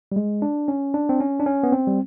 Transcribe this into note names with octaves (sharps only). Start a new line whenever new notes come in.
G3
G#3
D4
C#4
D4
C4
C#4
D4
C#4
B3
C4
G3